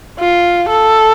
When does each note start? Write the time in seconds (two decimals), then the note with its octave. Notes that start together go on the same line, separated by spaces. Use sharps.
0.20 F4
0.69 A4